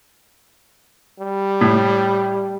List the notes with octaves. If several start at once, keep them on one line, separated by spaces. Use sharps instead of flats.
G3
A2